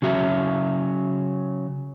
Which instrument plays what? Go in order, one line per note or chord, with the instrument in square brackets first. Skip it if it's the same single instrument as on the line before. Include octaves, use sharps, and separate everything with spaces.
[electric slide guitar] C#3 F#3 F#4 E5